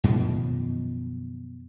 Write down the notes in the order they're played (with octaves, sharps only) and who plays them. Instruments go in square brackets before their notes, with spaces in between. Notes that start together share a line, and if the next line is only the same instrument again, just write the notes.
[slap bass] F#2 B2 D#3 F3